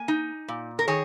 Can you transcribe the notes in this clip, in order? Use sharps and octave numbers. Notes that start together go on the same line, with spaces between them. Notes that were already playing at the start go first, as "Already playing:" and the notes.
Already playing: A#3 G#5
D#4
A#2
A#4
D#3 G#4 C#5